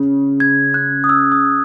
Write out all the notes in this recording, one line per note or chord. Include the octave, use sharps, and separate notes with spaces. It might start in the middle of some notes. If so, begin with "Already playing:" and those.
Already playing: C#3
G#6
F#6
D#6
E6
D#6